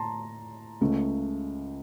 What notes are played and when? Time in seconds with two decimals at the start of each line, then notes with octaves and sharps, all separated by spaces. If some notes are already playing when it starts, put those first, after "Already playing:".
Already playing: A2 A5 A#5 C6
0.81 C#2 C#3 A3